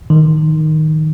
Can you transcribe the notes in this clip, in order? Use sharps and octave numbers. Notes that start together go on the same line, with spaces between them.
D#3